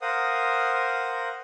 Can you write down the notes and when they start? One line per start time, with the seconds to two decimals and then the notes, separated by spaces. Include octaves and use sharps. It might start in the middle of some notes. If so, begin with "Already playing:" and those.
0.02 A#4 C5 F5 F#5 D#6